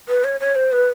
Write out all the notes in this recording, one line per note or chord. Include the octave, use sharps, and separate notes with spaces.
B4
C#5
C#5
C5
B4